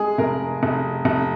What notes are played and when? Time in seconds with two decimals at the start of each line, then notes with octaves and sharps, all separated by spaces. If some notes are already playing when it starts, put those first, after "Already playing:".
Already playing: G#3 G#4
0.18 F1 A#4
0.63 F1
1.05 F1